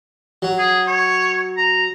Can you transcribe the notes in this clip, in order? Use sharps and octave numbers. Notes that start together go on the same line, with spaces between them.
F#3
G#4
C#5
A#5